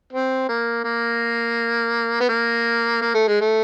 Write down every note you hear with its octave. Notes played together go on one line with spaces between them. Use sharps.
C4
A#3
A#3
B3
A#3
A#3
A3
G#3
A3